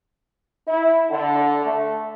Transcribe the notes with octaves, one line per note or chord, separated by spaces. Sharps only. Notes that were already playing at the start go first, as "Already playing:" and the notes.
E4
D3
A3